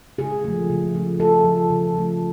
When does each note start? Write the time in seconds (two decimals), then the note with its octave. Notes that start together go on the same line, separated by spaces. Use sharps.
0.18 C#3 G#4
0.45 F3 A3
0.70 C#3
0.95 F3 A3
1.20 C#3 A4
1.45 F3 A3
1.70 C#3
1.95 F3 A3